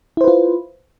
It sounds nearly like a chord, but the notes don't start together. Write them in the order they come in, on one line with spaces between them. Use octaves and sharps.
E4 C5 B4 F4